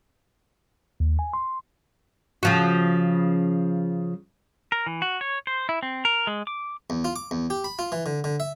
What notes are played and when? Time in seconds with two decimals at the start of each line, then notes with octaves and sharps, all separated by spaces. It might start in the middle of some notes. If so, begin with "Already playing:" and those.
1.00 D#2
1.19 G#5
1.33 C6
2.43 C#3 F3 F#4
4.72 A#4
4.86 E3
5.02 F#4
5.21 C#5
5.47 C5
5.69 E4
5.83 C4
6.05 A#4
6.27 G#3
6.47 D6
6.90 E2
7.05 F4
7.16 D6
7.31 E2
7.50 G4
7.64 B5
7.79 F4
7.92 E3
8.06 D3
8.24 D3
8.40 E5